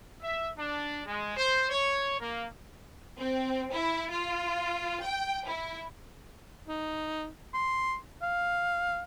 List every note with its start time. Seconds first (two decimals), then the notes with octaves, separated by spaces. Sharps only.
0.23 E5
0.58 D4
1.06 G#3
1.37 C5
1.69 C#5
2.20 A#3
3.19 C4
3.72 E4
4.10 F4
5.04 G5
5.47 E4
6.68 D#4
7.54 C6
8.22 F5